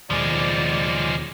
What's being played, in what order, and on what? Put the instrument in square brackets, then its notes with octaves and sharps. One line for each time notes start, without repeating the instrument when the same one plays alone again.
[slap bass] D#2 B2 D#3 [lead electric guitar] F3 G#3 [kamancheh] D5